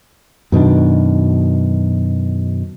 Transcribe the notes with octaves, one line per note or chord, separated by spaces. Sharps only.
F#2 B2 D#3 D4